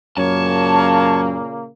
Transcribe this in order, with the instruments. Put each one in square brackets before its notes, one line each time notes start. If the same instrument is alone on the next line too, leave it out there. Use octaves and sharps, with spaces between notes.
[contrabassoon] F#2 [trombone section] A#2 C#3 A#3 [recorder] C#5 [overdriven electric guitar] A5